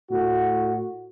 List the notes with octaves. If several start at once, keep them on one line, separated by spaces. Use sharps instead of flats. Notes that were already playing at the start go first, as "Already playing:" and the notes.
A2 F#4